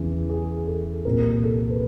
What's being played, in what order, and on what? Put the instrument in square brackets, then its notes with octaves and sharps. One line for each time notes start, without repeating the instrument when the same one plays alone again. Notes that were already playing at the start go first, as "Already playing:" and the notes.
Already playing: [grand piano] E2 C#3 E3 G#4
G#4
A4
C2 A#2 A#4
A4
B4